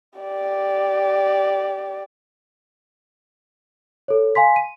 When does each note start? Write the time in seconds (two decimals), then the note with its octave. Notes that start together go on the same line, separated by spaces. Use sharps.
0.20 G4 D5
4.08 A4 C#5
4.35 F5 G#5 C6 B6
4.56 D#7